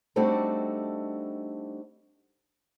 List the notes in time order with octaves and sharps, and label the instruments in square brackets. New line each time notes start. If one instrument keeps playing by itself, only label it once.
[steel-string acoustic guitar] G3 A3 C4 D4 D#4 F#4